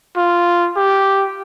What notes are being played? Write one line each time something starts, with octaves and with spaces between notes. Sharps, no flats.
F4
G4